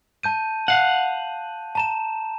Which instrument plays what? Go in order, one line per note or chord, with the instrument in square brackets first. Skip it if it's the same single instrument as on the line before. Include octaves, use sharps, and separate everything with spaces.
[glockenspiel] A5 G6 D#7
[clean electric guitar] F5 F#5
[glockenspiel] A5 A#5 E7